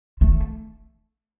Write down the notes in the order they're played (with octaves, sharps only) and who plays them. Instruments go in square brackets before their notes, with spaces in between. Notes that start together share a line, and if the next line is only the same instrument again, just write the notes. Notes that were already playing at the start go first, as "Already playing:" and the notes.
[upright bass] A3